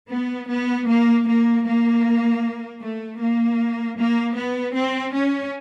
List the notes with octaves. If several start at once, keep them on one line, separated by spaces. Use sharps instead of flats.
B3
B3
A#3
A#3
A#3
A3
A#3
A#3
B3
C4
C#4